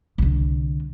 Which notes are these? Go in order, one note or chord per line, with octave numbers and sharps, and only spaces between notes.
C2 D3